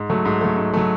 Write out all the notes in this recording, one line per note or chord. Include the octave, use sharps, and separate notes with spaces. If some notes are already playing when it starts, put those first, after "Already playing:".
Already playing: G#2
F#3 A3
G#2
F#3 A3
G#2
F#3 A3